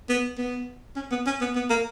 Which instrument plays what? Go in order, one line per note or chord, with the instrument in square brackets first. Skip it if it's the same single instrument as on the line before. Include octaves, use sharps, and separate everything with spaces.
[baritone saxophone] B3
B3
C#4
B3
C#4
B3
B3
A#3